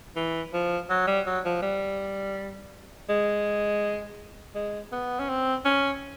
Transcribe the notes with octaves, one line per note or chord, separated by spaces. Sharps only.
E3
F3
F#3
G3
F#3
F3
G3
G#3
G#3
B3
C#4
C4
C#4